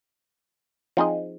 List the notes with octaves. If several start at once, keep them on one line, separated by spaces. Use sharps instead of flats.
F3 C4 D#4 G#4 D#5